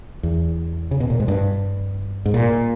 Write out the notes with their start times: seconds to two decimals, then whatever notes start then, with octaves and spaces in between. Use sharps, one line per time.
0.23 E2
0.91 C#3
1.00 B2
1.10 A#2
1.20 G#2
1.28 G2
2.25 G#2
2.34 A#2